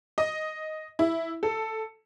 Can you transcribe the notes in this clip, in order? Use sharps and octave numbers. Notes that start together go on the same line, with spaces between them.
D#5
E4
A4